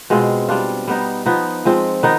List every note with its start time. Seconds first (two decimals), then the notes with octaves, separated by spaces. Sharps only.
0.10 B2 G#3 C4 F4
0.49 G3 D4 F4
0.87 G3 B3 D#4
1.25 F3 B3 D#4
1.65 F3 G#3 C4
2.03 D#3 B3 D#4